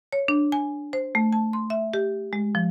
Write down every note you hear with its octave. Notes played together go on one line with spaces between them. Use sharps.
C#5
D4
G#5
C5
A3
A5
C6
E5
G4
G#3
F3